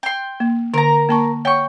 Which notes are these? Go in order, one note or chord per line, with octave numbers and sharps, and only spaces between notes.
G5 C6
A#3
D3 A#4 A#5
A#3 A5 C#6
C#5 F#5 G5 C#6